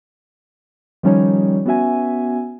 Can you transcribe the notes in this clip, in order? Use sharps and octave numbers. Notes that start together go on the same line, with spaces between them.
D#3 F3 G3 C#4 D#4 C#5
B3 C#4 F#4 E5 G#5